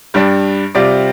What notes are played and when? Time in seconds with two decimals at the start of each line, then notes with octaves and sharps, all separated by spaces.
0.14 G2 G3 D4
0.75 C3 G3 C4 F4 D5